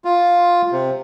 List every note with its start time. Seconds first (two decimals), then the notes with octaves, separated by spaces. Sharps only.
0.05 F4
0.72 C3